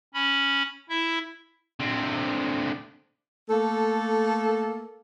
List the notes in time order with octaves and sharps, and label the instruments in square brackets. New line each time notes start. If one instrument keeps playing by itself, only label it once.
[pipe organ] C#4 B5
E4 E5
[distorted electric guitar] D3 C4
[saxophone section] A3 A#3 A4